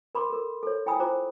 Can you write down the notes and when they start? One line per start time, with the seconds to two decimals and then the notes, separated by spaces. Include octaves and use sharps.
0.15 A#4 B5 C6 D6
0.30 A4 A#4
0.63 A4 C#5
0.86 E4 G5 G#5 B5 D#6 E6
1.00 F4 C5 A#5 D6